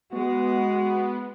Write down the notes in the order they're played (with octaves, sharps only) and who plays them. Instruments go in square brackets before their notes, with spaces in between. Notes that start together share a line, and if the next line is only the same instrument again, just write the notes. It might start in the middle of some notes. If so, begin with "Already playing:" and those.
[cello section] G#3 [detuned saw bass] B3 [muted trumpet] F#4